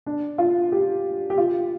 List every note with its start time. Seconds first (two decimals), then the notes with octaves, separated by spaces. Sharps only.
0.06 D4
0.38 F4
0.72 G4
1.30 G4
1.38 F4